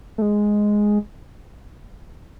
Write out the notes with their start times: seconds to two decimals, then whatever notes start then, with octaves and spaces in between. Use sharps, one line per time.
0.18 A3
0.22 G#3